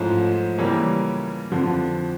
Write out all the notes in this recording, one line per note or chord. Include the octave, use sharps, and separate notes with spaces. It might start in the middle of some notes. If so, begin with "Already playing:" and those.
Already playing: G#2 F3 A3 C#4 E4
C#3 E3 G3 A#3 C#4
F2 D3 F3